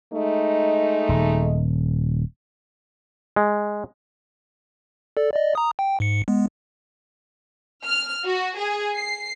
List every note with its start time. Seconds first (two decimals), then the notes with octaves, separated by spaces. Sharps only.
0.13 G#3 A3 D#4
1.09 D#1
3.36 G#3
5.17 A4 D5
5.34 D5 D#5
5.55 A#5 D#6
5.79 G5
6.00 G#2 C#7
6.28 G#3 B3
7.85 F6
8.25 F#4
8.58 G#4
8.96 C7